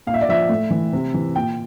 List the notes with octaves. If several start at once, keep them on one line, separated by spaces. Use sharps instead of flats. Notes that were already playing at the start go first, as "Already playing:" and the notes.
A#2 F5
E5
D5
F3 E5
A2
E3
C3
E3
A#2 G5